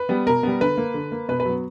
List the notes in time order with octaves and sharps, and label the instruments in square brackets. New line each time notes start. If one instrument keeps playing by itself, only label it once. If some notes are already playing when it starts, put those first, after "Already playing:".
Already playing: [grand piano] B4
G3 B3
B2 A#4
G3 B3
D3 B4
A#3
D3
A#3
B2 B4
B4
F#3 B3